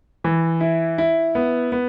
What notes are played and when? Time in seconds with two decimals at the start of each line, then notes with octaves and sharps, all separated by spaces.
0.24 E3
0.61 E4
0.98 E4
1.35 B3
1.72 B3